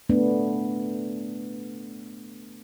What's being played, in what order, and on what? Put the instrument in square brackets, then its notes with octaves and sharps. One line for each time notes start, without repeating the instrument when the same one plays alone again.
[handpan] A3 B3 D4